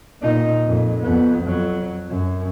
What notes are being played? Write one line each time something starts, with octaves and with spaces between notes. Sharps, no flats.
A#2 D#4
F2 A#2
F2 B3
F2 F#3
F#2